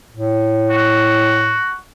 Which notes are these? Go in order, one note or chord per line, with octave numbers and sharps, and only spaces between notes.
A2
F#4